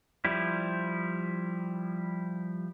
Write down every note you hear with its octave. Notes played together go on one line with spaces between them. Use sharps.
F3 G3 E4